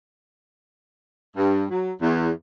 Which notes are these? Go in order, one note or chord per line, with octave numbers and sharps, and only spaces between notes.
G2
F#3
E2